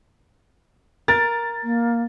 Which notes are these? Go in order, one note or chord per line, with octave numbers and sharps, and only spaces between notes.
A#4 A6
A#3